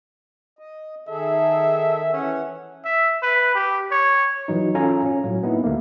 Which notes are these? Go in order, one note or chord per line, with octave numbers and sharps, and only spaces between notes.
D#5
D#3 G#4 A4 E5
E3 C#4 F#5
E5
B4
G4
C#5
E3 F#3 D#4
C#4 F4 A4 F5 G#5 A#5
C#4
A2 F#3
A#3 B3 D#4 E4
D2 A3 A#3